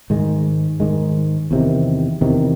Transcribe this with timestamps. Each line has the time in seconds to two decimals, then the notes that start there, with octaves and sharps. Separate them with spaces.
0.10 G#2 D#3 G#3
0.80 G#2 D#3 G#3
1.51 E2 C3 D#3
2.21 E2 C3 D#3